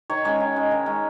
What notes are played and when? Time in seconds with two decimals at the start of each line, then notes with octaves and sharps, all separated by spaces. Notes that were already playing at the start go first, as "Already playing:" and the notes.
0.10 D#3 C#5
0.24 G#3 C#4 C#5
0.40 D#3
0.56 G#3 C#4
0.71 D#3
0.86 G#3 C#4